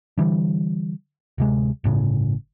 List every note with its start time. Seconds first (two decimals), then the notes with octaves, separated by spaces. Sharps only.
0.17 D3 E3 G3
1.38 D1 C3 G#3
1.84 G1 A2 C#3